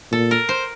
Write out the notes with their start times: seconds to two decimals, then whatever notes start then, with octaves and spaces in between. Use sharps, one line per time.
0.12 A#2 A4
0.31 A#4
0.49 C5